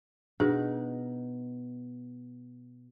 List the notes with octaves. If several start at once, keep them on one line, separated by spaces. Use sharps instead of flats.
B2 D4 D#4 G#4